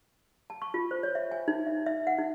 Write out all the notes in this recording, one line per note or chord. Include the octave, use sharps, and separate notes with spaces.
A5
C#6
F4
C5
C#5
E5
G#5
D#4
E5
E5
F#5
D#4